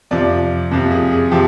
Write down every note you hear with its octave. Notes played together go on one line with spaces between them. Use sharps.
F2 C3 F3 D5
F2 C3 F3
G#4
G#4
C3 F3 G4